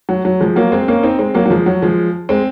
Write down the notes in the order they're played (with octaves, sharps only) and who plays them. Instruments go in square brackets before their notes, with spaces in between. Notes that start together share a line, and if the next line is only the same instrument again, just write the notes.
[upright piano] F#3
F#3
F3 G#3
F#3 A#3
G#3 C4
A#3 C#4
C4 D#4
G#3 C4
F#3 A#3
F#3
F3 G#3
F#3
F3 G#3
G#3 C4